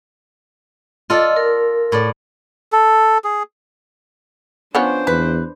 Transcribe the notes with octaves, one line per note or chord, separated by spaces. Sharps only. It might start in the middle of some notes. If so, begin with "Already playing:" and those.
F4 A4 D5 D#5
A#4
A2 D5
A4
G#4
F3 B3 C#4 D4 C5
E2 B4